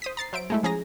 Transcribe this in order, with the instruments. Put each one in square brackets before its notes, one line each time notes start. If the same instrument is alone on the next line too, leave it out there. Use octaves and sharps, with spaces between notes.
[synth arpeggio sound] C5 D#6 B6
A#5 A6 C7
F#3 C5 E5 D7
G#3 A3 E4
F3 C#4 G#4 G#5 A#5 A#6